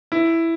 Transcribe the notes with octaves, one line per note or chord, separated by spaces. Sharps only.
E4